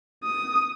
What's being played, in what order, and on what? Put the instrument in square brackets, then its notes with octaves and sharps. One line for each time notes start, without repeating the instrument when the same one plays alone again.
[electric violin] D#6